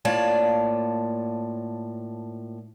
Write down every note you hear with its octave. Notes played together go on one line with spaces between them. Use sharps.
A2 A#3 F4 C#5 D5 A5